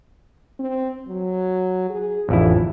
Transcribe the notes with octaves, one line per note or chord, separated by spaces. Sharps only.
C4
F#3
G#4
A1 F2 D3 E4